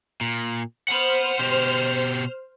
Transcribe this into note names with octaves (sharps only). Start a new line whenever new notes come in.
A#2
C5 F#5 B5 F6
B2 G4